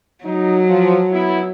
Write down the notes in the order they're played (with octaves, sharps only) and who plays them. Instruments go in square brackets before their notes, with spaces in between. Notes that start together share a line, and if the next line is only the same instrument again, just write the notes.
[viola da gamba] F#3 [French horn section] D#4
[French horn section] F3
B3 E4